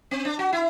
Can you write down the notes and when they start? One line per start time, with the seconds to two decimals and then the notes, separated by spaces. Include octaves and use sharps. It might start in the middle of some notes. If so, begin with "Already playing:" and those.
0.11 C4
0.25 D4
0.39 F#4
0.53 E4